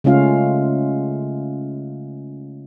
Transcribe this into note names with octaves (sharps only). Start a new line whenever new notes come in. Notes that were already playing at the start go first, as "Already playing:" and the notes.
C#3 G#3 A3 C#4 F4 F5